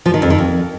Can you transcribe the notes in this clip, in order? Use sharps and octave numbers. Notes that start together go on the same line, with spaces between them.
F3
D#3
F2
D#3
F2